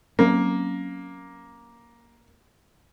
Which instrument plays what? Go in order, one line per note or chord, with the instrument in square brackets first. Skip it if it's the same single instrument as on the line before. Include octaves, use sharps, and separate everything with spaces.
[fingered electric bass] F#3 C4 C#4 [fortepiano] A#3